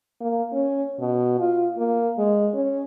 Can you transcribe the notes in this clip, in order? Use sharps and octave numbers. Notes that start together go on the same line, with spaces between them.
A#3
C#4
B2
F4
A#3
G#3
C#4